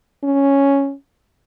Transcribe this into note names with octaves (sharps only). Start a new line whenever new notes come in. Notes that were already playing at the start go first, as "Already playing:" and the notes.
C#4